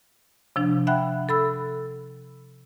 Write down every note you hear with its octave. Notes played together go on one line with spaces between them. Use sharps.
C3 F3 D4
E5 F#5 G5 B5 F#6
A4 B5 E6